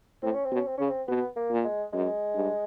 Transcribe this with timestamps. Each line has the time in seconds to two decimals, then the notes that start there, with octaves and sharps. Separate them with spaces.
0.22 A2 C4
0.34 C#4
0.45 C4
0.51 B2
0.56 C#4
0.66 C4
0.78 C#3 C#4
0.89 C4
1.08 B2 B3
1.36 A#3
1.51 A#2
1.64 G#3
1.93 F#2 G#3
2.35 G2